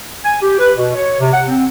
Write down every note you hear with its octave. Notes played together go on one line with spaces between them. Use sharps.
G#5
G4
B4
B2
C#5
C3
F#5
C4